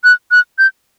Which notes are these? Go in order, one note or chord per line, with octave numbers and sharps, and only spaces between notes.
F#6
F#6
G6